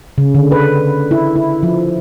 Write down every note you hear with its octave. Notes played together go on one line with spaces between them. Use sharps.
C#3
D3
B4
E4
E4
F3